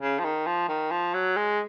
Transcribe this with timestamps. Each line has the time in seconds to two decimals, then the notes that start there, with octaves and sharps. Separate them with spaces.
0.02 C#3
0.20 F3
0.24 D#3
0.47 F3
0.69 D#3
0.91 F3
1.14 F#3
1.37 G#3